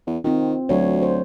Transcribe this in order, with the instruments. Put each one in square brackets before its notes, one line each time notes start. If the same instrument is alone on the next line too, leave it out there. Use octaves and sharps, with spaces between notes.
[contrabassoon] E2
[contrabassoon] D#3 [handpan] C4 F4
[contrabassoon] D2 [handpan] F#3 C#5
[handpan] C5